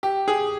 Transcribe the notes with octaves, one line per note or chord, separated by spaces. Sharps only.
G4
G#4